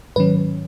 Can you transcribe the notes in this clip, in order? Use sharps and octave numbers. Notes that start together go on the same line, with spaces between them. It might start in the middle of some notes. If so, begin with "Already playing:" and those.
G#2 D#3 F#3 C#4 B4